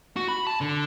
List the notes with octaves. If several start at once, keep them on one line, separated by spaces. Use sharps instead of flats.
F#4
B5
A5
D3